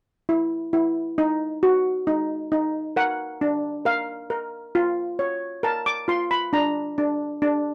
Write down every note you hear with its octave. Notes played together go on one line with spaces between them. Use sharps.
E4
E4
D#4
F#4
D#4
D#4
A#4 F#5
D4
A#4 F5
A#4
F4
C#5
A#4 A5
D6
F4 C6
B5
D4 A#5
D4
D4